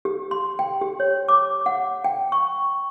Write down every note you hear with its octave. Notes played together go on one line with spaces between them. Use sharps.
G4
C6
G5
G4
C#5
D6
F#5
G5
C#6